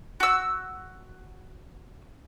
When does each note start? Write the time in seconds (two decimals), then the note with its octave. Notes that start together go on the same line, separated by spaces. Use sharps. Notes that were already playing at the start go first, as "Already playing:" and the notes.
0.20 F#4 E6